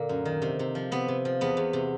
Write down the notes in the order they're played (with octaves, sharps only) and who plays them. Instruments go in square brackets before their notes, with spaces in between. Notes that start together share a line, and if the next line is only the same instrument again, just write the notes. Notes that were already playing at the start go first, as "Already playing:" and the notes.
Already playing: [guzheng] A#2 D3 A#3
F#2
D#3
C3
C3
F3
C3 B3
C3
F3
E2 B3
E2
C3